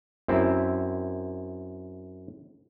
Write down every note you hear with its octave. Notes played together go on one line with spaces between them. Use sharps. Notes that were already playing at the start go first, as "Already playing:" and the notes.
F#2 C4 E4